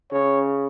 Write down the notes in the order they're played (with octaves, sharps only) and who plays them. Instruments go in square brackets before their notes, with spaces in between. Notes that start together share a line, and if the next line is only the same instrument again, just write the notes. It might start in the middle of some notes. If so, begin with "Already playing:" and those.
[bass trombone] C#3 [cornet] C#5